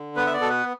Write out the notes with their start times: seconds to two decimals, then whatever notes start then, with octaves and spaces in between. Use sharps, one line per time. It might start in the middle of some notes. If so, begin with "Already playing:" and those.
Already playing: D3
0.16 B3 B4
0.27 E5
0.33 D5
0.41 B2 A4
0.50 B4